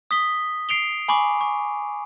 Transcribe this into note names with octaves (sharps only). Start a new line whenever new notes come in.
D#6 B6 G7
C7 D7 F7 G7
G#5 B5 C#6 D6
C#6